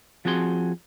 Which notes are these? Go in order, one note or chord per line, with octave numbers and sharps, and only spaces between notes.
F3 C4 F#4 G#4 C6